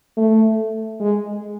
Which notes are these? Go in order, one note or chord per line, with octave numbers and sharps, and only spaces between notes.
A3
G#3